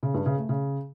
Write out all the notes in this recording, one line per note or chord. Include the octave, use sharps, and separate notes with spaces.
C#3
G2
C#3
A3
C#3